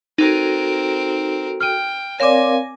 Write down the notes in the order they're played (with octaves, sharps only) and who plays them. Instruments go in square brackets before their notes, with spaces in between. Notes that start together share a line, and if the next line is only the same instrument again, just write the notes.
[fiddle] C4 A#4 [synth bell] D#4 [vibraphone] F#4 A4
[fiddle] G5 [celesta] F6 D#7
[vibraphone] C4 A#4 F5 [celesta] C#5 D5 [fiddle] G#5 [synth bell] D6 A#6